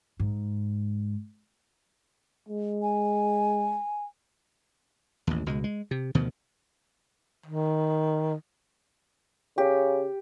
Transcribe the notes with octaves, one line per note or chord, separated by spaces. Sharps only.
G#2
G#3
G#5
A1 D#2
C#2 B2 G#3
G#3
C3
D2 B2 D#3 F3
D#3
C#3 G4